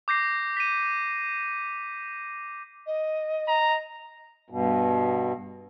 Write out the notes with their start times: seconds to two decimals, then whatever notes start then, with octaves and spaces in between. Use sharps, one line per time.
0.08 D6 G6 A#6 C7
0.57 B6 D#7
2.86 D#5
3.48 A#5
4.50 G2 B2